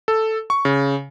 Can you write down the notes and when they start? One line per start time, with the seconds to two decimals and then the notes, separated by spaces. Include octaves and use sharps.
0.08 A4
0.50 C#6
0.65 C#3